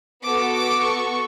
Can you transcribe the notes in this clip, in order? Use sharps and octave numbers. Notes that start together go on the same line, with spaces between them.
B3 F#4 A4 D6
D6
C#6